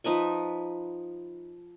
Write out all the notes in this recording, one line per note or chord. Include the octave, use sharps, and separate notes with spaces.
F3 D#4 B4 E5